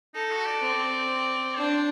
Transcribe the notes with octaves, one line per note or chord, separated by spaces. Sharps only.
D#4 A4
F#4
D5
C4
D4 C5